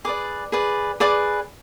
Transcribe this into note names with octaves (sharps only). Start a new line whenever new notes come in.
G#4 B4 D5 D6
G#4 B4 D5
G#4 B4 D5 D6